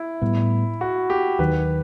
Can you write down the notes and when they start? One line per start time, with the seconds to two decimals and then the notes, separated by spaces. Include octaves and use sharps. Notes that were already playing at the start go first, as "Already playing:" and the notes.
Already playing: E4
0.22 A2 G3 B3
0.81 F#4
1.10 G4
1.39 D#2 D#3 F#3 B4